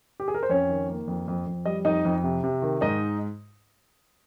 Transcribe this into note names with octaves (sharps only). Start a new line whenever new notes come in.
G4
G#4
A#4
C5
F2 C#4 C#5
D#3
A#3
F2
F2
F2
G3 D#5
F2 D#4 D#5
F2
C3
C3
D#3
G#2 D#4 D#5